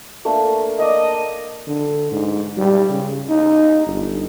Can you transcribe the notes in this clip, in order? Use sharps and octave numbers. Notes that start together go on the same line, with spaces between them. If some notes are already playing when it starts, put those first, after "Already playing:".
A3 A#3 D4
A#3 D5 D#5
D3
G#2
G3
C#3
D#4
G1